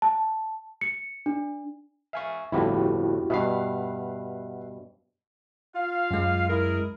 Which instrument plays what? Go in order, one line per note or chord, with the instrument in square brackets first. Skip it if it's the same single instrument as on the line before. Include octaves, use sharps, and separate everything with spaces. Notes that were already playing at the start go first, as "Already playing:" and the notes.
[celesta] A5
C#7
D4
[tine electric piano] E5 G#5 C#6 [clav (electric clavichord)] F5
[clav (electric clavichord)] G1 F2 A2 [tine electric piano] E4 F#4 G4
[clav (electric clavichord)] G2 B2 [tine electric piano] E5 F#5 C7
[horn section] F4 F5
[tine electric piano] F#2 G#3
[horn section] E4 G#4 A#4